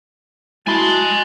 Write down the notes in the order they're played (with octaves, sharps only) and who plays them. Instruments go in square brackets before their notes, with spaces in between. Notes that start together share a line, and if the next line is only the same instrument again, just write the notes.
[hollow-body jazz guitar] G#3 E4 B5 [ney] F#4 [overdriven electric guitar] G#5 C6 [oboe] A5